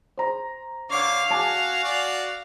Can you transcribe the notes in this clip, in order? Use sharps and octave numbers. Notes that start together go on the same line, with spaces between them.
C5 A#5
D3 C#5 F5 D6
F#4 G#5 A5 D6
F#4 D5